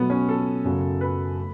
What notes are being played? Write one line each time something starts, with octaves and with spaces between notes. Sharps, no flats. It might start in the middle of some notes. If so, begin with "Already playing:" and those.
Already playing: B2 F#3 A3 B3
C#4
A4
F#2 C#3 F#3 A3
B4
A3